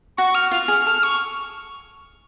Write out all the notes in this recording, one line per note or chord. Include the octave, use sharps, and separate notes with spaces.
F#4 C#6
F6
F4 F6
G#4
A4 F6
C#6